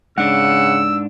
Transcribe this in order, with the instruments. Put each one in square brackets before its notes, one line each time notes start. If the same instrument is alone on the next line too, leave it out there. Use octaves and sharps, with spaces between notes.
[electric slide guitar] G#2 D4 [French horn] C#3 [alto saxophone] F#5 [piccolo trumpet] E6